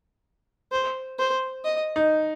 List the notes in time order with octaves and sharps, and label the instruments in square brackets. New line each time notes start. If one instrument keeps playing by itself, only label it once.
[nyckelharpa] C5
C5
D#5
[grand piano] D#4